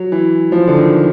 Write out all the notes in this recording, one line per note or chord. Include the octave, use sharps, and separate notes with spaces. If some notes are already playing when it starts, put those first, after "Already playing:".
Already playing: F#3
E3
F3
D3
D#3